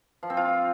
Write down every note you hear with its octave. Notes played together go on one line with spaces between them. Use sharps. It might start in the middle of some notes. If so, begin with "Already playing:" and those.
F3
C4
F4